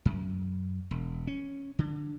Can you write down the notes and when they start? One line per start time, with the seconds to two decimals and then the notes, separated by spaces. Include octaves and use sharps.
0.05 F#2
0.91 E1
1.27 C#4
1.79 D3